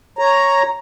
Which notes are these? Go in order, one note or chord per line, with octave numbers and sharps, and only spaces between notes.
C#5 A#5